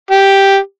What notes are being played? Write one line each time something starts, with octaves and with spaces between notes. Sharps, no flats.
G4